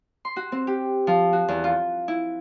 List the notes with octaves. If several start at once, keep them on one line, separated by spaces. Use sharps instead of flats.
C6
F#4
C4
G4
F3
F#4
E2
F4
E4